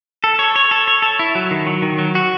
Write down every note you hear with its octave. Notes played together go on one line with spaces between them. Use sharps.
A4
C#5
C#5
A4
C#5
A4
E4
F#3
D#3
F#3
D#3
F#3
F#4